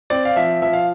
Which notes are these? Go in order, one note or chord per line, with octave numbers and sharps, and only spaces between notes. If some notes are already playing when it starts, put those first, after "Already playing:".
C4 D5
F5
F3 E5
F3 E5
F5